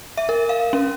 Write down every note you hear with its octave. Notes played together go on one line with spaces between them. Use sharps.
E5
A#4
F5
C#4